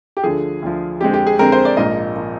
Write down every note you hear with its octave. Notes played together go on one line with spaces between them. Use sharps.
G4
D2 D3 F3 G#4
D2 D3 F3
F2 D3 G#3 C4 G4
G4
G#4
F2 D3 G#3 C4 A#4
C5
D5
A#1 G#2 F3 A#3 D#5
F3 A#3